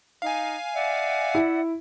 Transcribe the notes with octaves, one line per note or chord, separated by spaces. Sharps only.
D#4 F5 G#5
D5 E5 F#5
E4